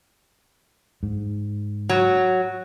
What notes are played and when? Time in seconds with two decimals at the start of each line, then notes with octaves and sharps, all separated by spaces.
1.03 G#2
1.89 F#3